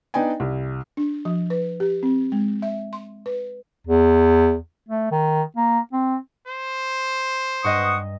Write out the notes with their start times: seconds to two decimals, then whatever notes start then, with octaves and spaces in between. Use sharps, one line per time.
0.14 B3 D4 D#4 D5 G5 G#5
0.40 C2
0.97 D4
1.25 F3
1.50 B4
1.80 G4
2.03 C4
2.32 G#3
2.62 E5
2.93 C6
3.26 B4
3.87 E2
4.89 A3
5.12 D#3
5.57 A#3
5.93 C4
6.48 C5
7.64 G2 D#5 F#5 C#6 D#6